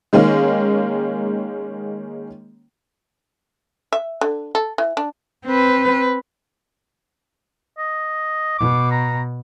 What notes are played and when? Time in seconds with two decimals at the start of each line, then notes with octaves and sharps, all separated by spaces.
0.13 D#3 G#3 A#3 C#4 D#4
3.92 E5
4.21 D3
4.55 A4
4.78 E3
4.97 D4
5.46 C4 B4
7.78 D#5
8.58 B2 D6
8.91 A#5